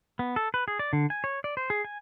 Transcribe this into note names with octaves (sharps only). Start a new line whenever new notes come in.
B3
A4
B4
G#4
D5
D3
G#5
C#5
D5
C5
G#4
G#5